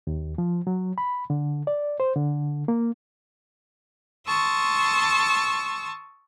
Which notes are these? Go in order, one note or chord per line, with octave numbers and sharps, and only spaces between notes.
D#2
F3
F#3
B5
D3
D5
C5
D3
A#3
A5 C6 C#6 D#6 E6